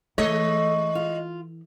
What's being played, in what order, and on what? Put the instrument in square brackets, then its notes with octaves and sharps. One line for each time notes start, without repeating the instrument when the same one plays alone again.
[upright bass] E3 [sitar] G#3 C#5 D#5 [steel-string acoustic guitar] A3
[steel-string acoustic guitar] F4